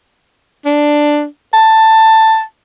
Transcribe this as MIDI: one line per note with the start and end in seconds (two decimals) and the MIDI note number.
0.66 1.25 62
1.54 2.42 81